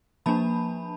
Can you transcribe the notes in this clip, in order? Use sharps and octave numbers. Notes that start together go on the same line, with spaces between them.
F3 A#3 D4 A5 B5